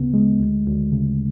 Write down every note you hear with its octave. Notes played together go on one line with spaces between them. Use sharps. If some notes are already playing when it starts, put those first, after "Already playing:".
Already playing: D2 C#3 B3
G#3
D2
D2
C#3